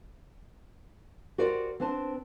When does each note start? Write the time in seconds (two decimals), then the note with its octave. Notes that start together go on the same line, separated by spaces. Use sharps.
1.38 F#4 G4 A#4 C5 D5
1.80 C4 D4 B4 C5 A5